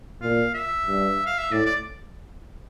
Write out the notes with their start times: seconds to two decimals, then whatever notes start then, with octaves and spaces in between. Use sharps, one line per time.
0.22 A#2 F5
0.54 E5
0.86 G2
1.26 F5
1.39 E5
1.51 A2 D5
1.66 D5